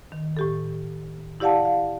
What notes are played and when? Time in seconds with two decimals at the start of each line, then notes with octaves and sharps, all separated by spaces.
0.12 D#3
0.37 A2 G4 A4
1.40 E4 G4 D5 F5 F#5 A5
1.65 F5